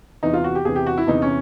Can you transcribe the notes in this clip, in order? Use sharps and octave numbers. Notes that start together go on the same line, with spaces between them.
E2 C3 E3 D#4
F4
F#4
G4
E2 C3 E3 G#4
G4
F#4
E4
E2 C3 E3 D#4
C#4